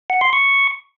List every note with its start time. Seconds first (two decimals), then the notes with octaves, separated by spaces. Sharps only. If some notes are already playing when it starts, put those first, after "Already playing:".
0.10 F#5
0.21 C6
0.33 C#6